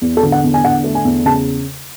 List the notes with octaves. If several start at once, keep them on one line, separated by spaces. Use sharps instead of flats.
E2
A4
D3
F#5
E2
G#5
D3 F#5
A3
G#5
E2
C#3 A5